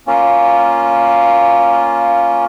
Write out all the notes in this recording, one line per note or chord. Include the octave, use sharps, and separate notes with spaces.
A#3 C#4 F4